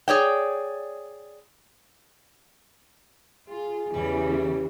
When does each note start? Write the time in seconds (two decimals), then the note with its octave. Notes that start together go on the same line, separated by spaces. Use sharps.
0.08 G#4 C#5 D5 G5
3.49 F4 G#4
3.94 E2 C#3 E3 G3